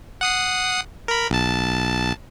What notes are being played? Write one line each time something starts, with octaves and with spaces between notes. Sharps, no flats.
F#5 D#6 C7
A#4 B5
B1 A5